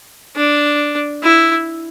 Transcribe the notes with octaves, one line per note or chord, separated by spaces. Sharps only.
D4
E4